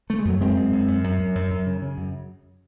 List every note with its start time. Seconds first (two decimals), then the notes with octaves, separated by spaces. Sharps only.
0.10 C#3 A3
0.19 G#3
0.25 F#2 F#3 A3
0.41 F#2 G#3 C4
0.56 F#2
0.72 F#2
0.88 F#2
1.04 F#2
1.19 F#2
1.35 F#2
1.51 F#2
1.66 C#3
1.82 C#3
1.98 F#2